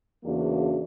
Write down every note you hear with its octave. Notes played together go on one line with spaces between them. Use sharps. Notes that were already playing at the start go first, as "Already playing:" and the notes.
E2 C#3 E3 A#3 D4 F#4